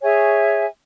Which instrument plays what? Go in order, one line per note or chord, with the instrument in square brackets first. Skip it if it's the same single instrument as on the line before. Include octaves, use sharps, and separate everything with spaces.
[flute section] G#4 C#5 E5 G#5